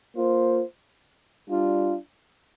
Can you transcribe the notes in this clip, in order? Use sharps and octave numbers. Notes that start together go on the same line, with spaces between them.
A#3 F4 C5
G3 D4 F4